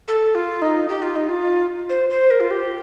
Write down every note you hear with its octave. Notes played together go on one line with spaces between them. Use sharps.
A4
F4
D#4
G4
F4
D#4
F4
C5
C5
A#4
F4
G4